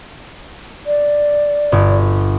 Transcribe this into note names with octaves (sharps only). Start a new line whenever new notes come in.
D5
G1